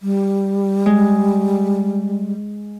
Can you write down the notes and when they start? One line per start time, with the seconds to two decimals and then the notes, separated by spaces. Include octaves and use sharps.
0.01 G3
0.86 G#3